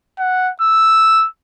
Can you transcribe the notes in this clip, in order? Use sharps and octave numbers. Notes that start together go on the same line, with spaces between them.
F#5
E6